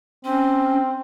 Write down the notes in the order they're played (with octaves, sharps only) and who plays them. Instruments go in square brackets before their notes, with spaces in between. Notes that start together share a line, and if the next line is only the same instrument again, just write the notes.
[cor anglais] C4 [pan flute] C#4